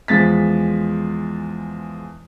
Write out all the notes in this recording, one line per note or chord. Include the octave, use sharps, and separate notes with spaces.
E2 F3 G#3 A6 B6